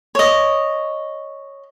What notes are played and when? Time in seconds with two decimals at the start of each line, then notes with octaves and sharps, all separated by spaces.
0.15 C#5 D#5